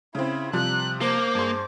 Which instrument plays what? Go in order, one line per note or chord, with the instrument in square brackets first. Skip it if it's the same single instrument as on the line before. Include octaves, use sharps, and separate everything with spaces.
[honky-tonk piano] C#3 C4 [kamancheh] E4
[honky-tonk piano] C3 F3 G3 [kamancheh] F#6
[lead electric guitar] A#3 [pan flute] C5 [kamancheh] D6
[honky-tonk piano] G2 G#4 C6